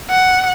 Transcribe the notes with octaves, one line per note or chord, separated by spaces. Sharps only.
F#5